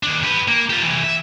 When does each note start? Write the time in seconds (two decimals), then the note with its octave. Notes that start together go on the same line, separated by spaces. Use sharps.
0.03 D#2 D4
0.23 G4 B4
0.48 A#3
0.70 F4 G4
0.83 C3 E3
1.04 E5